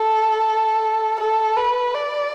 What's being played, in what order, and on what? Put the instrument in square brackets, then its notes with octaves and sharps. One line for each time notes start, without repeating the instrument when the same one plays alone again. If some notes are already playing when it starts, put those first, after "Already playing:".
Already playing: [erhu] A4
A4
B4
D5